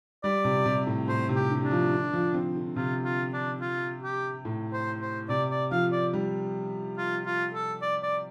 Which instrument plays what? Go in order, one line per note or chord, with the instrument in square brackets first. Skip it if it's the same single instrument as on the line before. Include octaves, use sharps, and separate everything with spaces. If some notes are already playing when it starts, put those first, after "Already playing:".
[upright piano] G3 [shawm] D5
[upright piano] C3
C3
A2
[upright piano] A2 [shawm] C5
[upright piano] C3
[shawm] G4
[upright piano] D3
[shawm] D4
[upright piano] F3
D3
F3
C4
D3
[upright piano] C3 [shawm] F4
[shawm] F4
D4
F4
G4
[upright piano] A2
[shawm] C5
C5
[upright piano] C3 [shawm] D5
[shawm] D5
[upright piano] F3 [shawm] F5
[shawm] D5
[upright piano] G3
[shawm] F4
F4
A4
D5
D5